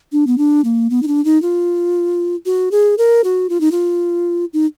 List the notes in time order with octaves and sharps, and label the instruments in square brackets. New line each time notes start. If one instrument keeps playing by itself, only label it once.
[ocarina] D4
B3
D4
A#3
B3
D#4
D4
D#4
F4
F#4
G#4
A#4
F#4
F4
D#4
F4
D#4